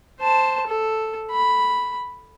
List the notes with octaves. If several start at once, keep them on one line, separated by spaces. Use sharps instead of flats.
C5 A5
A4
B5